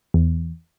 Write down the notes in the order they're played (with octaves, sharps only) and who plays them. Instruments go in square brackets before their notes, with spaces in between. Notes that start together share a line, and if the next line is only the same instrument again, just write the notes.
[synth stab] E2